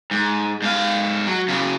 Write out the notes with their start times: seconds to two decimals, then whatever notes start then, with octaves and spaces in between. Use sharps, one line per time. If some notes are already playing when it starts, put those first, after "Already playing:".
0.11 G#2
0.62 G#2 F5
1.27 F#3
1.48 C#3 F#3